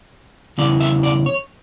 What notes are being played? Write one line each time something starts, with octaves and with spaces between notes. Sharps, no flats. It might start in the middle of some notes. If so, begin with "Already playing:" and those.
E2 C#3 E3 D5
E5
D5
C#5